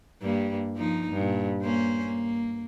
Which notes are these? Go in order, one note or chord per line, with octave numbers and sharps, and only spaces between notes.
G2 G3 A#3
F3 A#3 D#4
G2 A#2
A#3 C#4 C5
A#3